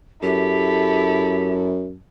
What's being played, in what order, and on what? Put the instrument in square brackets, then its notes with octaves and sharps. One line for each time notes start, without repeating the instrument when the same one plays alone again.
[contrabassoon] F#2 [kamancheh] E4 A4 [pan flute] G4